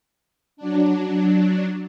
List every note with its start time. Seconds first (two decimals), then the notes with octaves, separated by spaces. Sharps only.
0.57 F#3 D4